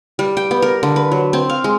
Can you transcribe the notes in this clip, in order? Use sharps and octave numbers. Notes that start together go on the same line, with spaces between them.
G3
G5
B3
A#4
D3
B4
F#3
C4
F5
G#3